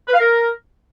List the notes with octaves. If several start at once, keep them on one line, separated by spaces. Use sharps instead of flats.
B4
F5
A#4